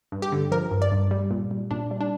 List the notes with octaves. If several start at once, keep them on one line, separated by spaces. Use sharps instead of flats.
G2
G4
D3
F3 A#4
G2
D5
G2
G3
A#2
G3
A#2 D4
G3
D4